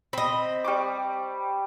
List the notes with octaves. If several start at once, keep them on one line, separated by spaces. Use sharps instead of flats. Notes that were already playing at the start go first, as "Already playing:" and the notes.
C4 D#5 B5
G3 C#6 D6